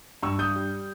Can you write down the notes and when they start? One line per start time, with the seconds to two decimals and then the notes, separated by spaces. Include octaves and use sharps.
0.23 G2 C#6 E6
0.38 G2 D#6 G6
0.56 G3